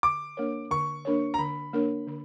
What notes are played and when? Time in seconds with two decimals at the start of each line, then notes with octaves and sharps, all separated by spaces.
0.03 D3 D6
0.37 A#3 D4 A#4 C#5
0.71 D3 C#6
1.05 A#3 D4 A#4 C#5
1.34 A#5
1.39 D3 B5
1.73 A#3 D4 A#4 C#5
2.07 D3